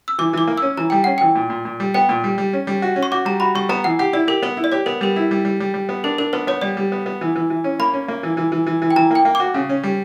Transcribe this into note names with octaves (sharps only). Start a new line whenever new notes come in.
E6
E3 D6
E3 D6
A#3
E6
C#4
E3 A#5
G3 G5
C#4 F#5
E3 G5
A#2
A#2
A#2
G3
B3 G5
A#2
G3
G3
C#4
G3
F#4
C#4
C#6
F#4 D6
G3 A#5
F#4 B5
G3 C#6
B3 A#5
E3 F#5
G4 F#5
E4 D5
G4 A#4
B3 B4
E4
D5
G4 C#5
B3 A#4
G3 A#4
E4
G3
G3
G3
G3
B3
D4 A#4
D4 A#4
B3 B4
B3 C#5
G3 D5
G3
B3
B3
E3
E3
E3
C#4
A#3 B5
C#4
A#3
E3
E3
E3
E3
E3
G5
E3 A#5
A#3 G5
A#3
D6
F#4
C#3
C#4
G3